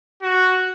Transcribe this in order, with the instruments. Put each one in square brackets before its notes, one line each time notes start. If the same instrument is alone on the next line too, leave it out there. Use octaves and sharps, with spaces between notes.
[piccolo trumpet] F#4